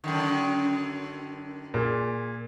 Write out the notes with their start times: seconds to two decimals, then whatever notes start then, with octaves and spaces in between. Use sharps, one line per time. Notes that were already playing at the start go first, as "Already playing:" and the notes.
0.04 F#2 D3 D#3
1.74 A#2 G#4